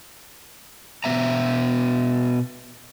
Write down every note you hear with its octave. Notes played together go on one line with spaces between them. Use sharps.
B2 B3 E5 A#5